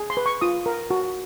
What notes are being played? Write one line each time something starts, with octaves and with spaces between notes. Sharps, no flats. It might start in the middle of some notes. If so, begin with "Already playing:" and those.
Already playing: G#4
C6
B4
C#6
F4 D#6
A#4
F#4